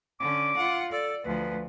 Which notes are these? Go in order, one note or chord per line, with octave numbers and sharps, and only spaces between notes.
D3 C#4 D6
F4 F#5
A4 D5
D2 F3 B4